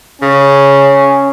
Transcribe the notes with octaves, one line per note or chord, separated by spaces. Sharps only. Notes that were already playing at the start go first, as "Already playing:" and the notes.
C#3 C#4